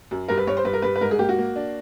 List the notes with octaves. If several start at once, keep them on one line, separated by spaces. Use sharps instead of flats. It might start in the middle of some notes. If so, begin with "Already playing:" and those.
F#2
G2 A#4
B4
G2 C#5
C5
G2 B4
A#4
G2 B4
B4
G#2 A#4
G#4
A#3 G4
F#4
A#3
D4